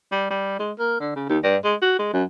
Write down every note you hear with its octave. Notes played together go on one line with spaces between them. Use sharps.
G3
G3
G#3
A#3
D3
C#3
D#2
G2
G#3
F#4
G#3
F#2